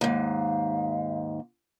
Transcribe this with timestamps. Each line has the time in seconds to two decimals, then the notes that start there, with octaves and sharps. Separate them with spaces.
0.01 D#2 G#2 F5